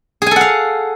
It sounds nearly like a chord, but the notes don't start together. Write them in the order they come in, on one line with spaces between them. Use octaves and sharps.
G#4 G#5 A4 F#5 F5